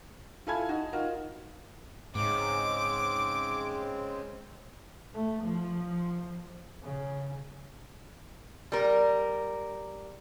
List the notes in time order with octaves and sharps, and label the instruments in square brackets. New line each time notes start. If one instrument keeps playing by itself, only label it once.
[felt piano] E4 F4 A4 G#5 B5 G#6
D#4 F#4
D#4 F4 F#4 A#4
[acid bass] G#2 [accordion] C#3 G#3 C4 [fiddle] D6
[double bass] A3
F3
C#3
[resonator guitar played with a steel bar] G3 A#4